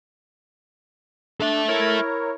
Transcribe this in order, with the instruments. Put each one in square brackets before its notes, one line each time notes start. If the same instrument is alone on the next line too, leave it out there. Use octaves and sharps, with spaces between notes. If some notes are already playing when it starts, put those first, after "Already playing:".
[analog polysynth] D4 [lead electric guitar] A4 E5
[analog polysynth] E4 A#4 C#5